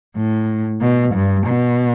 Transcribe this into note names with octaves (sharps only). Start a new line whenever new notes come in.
A2
B2
G2
B2